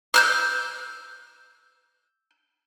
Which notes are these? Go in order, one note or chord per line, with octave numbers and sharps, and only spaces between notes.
E6 F6 G6